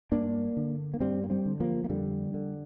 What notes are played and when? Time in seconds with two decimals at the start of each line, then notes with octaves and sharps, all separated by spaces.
0.12 G2 A#3 D4
0.57 D3
0.94 A#3
1.00 G2 G3 C4
1.24 A#3
1.30 G3 C4
1.46 D3
1.60 F3 A#3
1.84 A#3
1.89 F2 D3 G3
2.34 D3